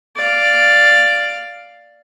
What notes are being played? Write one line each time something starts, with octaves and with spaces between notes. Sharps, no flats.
D5 F5